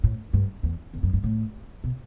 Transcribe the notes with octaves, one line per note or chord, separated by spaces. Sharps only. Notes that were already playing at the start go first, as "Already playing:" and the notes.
A2
G2
E2
E2
F#2
G2
A2
B2